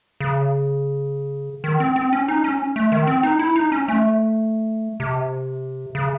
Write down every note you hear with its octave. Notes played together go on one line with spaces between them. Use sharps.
C#3
D#3
C4
C4
C#4
D#4
C#4
A3
D#3
C4
D#4
E4
D#4
C#4
A3
C3
C#3